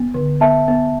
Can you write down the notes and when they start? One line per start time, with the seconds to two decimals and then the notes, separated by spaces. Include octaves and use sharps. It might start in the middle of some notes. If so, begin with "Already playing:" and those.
Already playing: B3
0.14 D3
0.41 B3 E5 A5
0.68 B3